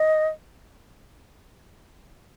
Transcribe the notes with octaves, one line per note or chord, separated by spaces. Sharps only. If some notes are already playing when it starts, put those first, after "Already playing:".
Already playing: D#5